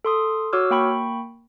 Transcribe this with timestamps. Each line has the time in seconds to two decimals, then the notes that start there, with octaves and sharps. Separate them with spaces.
0.05 A4 C6 D#6
0.53 F#4 C#5 D6 E6 F6
0.71 A#3 G5 B5 C#6